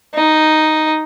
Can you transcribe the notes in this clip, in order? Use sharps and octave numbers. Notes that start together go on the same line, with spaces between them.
D#4